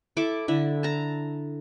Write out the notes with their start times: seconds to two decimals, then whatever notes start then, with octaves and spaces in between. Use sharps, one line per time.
0.17 E4 A4 D6
0.48 D3 E4
0.83 A5 A#5